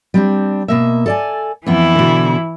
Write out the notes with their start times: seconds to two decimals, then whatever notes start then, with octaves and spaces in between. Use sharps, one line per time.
0.14 G3 C4 D4
0.68 B2 A#3 E5
1.06 A4 D5 G#5
1.66 F2 E3 B3 E4
1.95 B2 D3